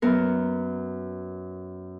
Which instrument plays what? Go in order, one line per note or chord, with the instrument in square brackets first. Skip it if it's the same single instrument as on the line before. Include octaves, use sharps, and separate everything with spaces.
[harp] F#2 B3 F#4 A#4